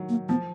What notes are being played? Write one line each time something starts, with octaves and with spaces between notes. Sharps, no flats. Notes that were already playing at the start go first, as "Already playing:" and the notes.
Already playing: D#3 F#3
A#3
F3 B3